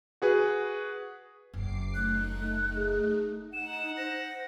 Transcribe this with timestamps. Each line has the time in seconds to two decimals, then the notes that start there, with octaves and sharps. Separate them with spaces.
0.22 F#4 G#4 B4
1.54 F#1 C#3 D6 C7
1.95 A3 D#4 F#6
2.76 G#4
3.54 D#4 F#5 E7
3.97 C5 A#6